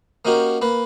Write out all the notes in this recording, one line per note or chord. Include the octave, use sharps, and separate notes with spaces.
A#3 C#4 D#4 F#4 G4 A#4
A#3 B4